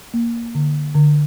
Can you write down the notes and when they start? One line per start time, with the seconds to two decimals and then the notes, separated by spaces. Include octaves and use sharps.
0.14 A#3
0.55 D3
0.95 D3